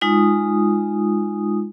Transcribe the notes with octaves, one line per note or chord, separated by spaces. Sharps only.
G#3 D#4 F4 D#6